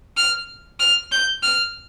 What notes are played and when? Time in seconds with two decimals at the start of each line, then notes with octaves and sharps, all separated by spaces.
0.17 F6
0.80 F6
1.12 G6
1.43 F6